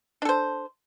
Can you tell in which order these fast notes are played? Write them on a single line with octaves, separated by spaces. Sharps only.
D4 A4 C5